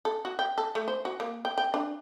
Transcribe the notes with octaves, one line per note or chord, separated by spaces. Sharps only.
A4
F#4
G5
A4
A3
C5
F#4
A#3
G5
G5
D4